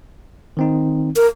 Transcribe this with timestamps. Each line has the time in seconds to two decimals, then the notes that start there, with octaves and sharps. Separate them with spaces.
0.57 D#3 C4 D#4
1.16 A#4